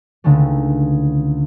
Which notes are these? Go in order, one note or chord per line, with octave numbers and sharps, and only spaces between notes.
C#2 D3 D#3 G#3 A3